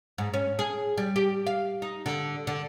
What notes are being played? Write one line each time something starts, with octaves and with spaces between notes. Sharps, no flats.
G#2
C#4
G#4
G3
G4
F5
D#4
D3
D3